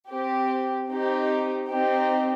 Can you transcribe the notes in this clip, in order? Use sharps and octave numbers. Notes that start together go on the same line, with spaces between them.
C4 G4
C4 D#4 G4
C4 D#4 G4